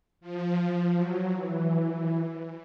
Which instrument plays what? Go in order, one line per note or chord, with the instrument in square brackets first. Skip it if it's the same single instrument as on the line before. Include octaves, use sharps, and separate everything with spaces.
[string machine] F3
F#3
E3